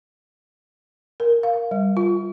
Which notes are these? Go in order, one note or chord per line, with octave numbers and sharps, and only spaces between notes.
A#4
F5
G3
F4